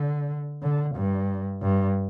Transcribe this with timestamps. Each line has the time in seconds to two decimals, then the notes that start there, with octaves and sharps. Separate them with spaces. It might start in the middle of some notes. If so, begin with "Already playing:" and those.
Already playing: D3
0.62 D3
0.96 G2
1.62 G2